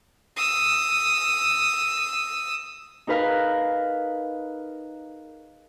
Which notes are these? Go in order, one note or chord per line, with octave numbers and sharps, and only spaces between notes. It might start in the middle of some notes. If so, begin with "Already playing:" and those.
D#6 E6
D#4 G#4 A#4 B4 F5